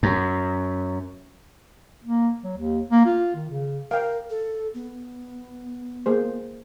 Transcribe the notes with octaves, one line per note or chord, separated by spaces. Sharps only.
F#2
A#3
F#3
D#2
A#3
F4
D#3
C#3
A#4 F5 G5
A4
B3
A#3 G#4 C5